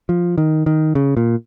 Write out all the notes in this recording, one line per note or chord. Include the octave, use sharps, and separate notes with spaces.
F3
D#3
D#3
C#3
A#2